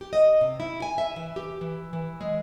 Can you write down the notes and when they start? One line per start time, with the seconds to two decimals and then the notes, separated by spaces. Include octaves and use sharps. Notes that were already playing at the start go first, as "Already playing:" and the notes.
0.01 G4
0.13 D#5
0.41 C3
0.60 E4
0.82 G#5
0.98 E5
1.16 E3
1.36 G4
1.61 E3
1.93 E3
2.21 G#3